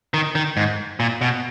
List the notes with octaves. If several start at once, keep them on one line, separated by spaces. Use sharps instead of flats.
D#3
D#3
G#2
A#2
B2